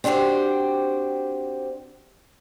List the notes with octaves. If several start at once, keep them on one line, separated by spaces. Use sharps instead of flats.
C4 D4 F#4 G4 C5